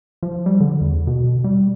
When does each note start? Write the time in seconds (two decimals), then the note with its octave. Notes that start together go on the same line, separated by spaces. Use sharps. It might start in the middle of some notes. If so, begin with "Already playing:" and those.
0.23 F3
0.46 G3
0.60 D3
0.81 E2
1.07 B2
1.44 G3